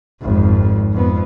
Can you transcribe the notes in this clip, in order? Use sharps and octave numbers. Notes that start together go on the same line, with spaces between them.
G#1 F2
F2 B3